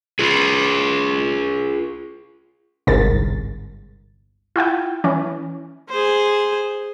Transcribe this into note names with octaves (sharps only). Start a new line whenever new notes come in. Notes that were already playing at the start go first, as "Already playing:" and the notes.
F4 G#4
G1 C2 G#2 A#4 A6
E4 F4 F#5 G5
E3 C#4
G#4 C5